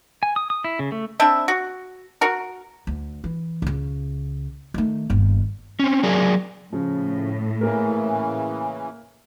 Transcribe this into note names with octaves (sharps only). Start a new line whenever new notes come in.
G#5
D#6
D#6
E4
C#3
A3
C4 D4 E4 E5
F#4
F#4 A#4
D2
E3
C#2 C#3
D#3 A3
G1 D#2
C4 C#4
F#3 G#4 A#4 D5
A2 C#3 F3
C#3 E3 A#3 A#4